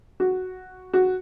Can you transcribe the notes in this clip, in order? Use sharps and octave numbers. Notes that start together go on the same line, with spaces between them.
F#4
F#4